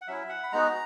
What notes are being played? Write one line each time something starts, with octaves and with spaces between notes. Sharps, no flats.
F#5
F#3 C#4 E4 E5
F#5
B5
G#3 B3 D#4 F#4 A#5